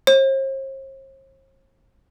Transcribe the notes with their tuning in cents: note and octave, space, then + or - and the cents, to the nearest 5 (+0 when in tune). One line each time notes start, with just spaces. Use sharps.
C5 +45